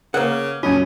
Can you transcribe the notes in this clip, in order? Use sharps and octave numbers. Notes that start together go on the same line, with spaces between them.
C#3 A#3 A#4 B4 F#5
F#2 C#4 F4 D#5